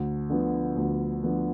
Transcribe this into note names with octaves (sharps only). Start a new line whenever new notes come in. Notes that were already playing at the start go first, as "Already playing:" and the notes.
Already playing: D2
D3 F3 B3
D2
D3 F3 B3